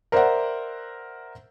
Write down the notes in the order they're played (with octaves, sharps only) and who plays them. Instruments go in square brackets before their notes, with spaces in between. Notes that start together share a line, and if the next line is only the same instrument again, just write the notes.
[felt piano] A#4 C5 D5 E5 F#5